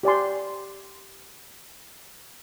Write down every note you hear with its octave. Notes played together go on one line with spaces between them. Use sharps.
G4 D5 G#5 C6